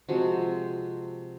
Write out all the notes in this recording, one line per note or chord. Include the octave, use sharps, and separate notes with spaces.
C3 F3 G#3 F#4